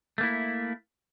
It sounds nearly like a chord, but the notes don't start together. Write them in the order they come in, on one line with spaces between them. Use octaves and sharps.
A3 A#3 E4